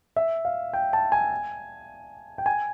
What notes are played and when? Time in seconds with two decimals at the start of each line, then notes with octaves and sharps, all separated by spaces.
0.16 E5
0.45 F5
0.73 G5
0.93 A5
1.12 G#5
2.38 G5
2.46 G#5